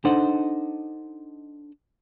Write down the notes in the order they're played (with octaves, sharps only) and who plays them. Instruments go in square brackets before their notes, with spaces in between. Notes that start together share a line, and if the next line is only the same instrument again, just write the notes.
[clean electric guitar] D4 D#4 A4 C5 D#5 F#5